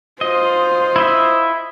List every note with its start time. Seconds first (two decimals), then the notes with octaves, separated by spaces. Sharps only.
0.21 F4 C5 D#5
0.96 E4 D#5 E5